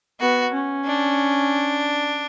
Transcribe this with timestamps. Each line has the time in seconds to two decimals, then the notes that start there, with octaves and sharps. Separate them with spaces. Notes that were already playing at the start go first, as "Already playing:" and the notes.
0.20 B3 F#4
0.53 C#4
0.86 D4